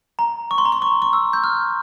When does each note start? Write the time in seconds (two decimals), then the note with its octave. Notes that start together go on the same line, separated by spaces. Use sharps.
0.19 A#5
0.51 C#6
0.58 C6
0.65 A#5
0.72 C6
0.82 C#6
1.02 C#6
1.13 E6
1.33 G6
1.44 F6